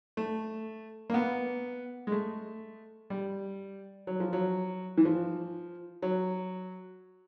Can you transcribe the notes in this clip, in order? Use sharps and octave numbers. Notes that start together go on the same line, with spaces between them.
A3
A#3
B3
G#3
A3
G3
F#3
F3
F#3
E3
F3
F#3